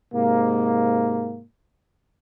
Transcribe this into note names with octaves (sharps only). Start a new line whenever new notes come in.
G#2 C3 A#3